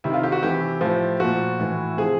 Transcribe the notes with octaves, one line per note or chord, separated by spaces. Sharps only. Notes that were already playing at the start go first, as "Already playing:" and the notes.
C3 D#3 E4
F4
G4
F#4
C3 E3 G4
A2 F3
A#2 F3 F#4
A2 E3
C3 F3 G#4